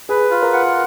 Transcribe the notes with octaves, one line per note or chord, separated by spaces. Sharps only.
G#4 B4
F4
A#4
F#5